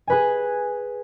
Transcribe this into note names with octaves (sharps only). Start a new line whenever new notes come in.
G#4 B4 G#5